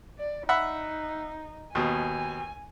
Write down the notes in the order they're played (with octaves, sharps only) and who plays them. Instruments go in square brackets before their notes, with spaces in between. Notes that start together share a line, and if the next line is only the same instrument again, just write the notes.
[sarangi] D5
[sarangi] D#4 [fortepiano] E5 F#5 B5
[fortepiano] D#2 B2 [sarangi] G#5